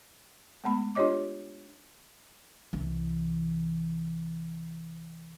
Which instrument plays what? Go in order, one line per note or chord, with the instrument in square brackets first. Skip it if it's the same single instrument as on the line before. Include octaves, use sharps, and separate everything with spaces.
[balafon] G#3 A3 B3 B5
D4 F4 G4 C#5 D#5 D6
[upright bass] C2 E3